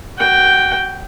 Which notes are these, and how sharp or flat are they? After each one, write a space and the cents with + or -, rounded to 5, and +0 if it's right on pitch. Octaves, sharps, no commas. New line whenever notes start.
F#4 +20 G5 +0